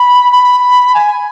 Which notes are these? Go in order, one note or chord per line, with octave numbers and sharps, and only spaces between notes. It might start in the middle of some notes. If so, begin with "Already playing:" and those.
Already playing: B5
B5
G#5